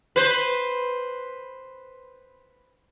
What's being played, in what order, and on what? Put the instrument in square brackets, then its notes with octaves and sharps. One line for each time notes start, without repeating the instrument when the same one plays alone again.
[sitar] B4 C5